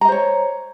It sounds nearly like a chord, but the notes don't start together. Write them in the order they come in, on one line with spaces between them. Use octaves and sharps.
A#5 D#5 C5 C#5